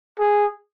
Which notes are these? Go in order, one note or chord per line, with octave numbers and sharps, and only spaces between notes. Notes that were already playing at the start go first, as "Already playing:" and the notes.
G#4